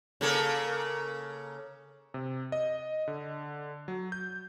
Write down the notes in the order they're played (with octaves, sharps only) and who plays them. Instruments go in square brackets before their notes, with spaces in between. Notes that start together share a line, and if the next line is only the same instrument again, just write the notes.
[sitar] C#3 A#3 A4
[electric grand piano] C3
D#5
D3
F#3
G6